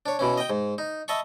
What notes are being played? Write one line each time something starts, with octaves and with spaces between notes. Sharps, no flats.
D4 C#5
B2 E3 C#4
D#5 G5
G#2
D#4
D#5 E5 A5 B5 C#6